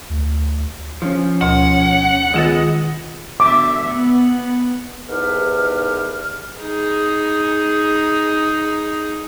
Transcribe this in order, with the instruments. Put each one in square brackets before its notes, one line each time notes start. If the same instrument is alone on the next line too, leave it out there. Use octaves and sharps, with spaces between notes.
[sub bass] D2
[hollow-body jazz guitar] F3 [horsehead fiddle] C#4
[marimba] D2 B2 [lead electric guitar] F#5
[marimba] D#3 F4 A6 [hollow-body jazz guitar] G#3 B3 [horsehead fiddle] D#5
[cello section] B2 D3 E5 [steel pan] D6
[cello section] B3
[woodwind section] E2 G#2 D#3 G4 B4 F6
[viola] D#4 G#4